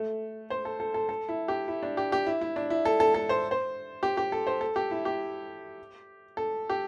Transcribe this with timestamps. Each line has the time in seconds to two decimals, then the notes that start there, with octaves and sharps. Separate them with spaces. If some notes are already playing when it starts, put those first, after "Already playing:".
Already playing: A3
0.50 C5
0.65 A4
0.80 A4
0.94 A4
1.09 A4
1.29 E4
1.48 G4
1.68 E4
1.83 D4
1.97 G4
2.12 G4
2.27 E4
2.41 E4
2.56 D4
2.70 E4
2.85 A4
3.00 A4
3.14 A4
3.29 C5
3.51 C5
4.03 G4
4.17 G4
4.32 A4
4.47 C5
4.61 A4
4.76 G4
4.91 E4
5.05 G4
6.37 A4
6.70 G4